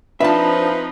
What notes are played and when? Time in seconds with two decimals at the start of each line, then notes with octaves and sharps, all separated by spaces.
0.20 F3 C4 D4 D#4 F4 B4 E5 A5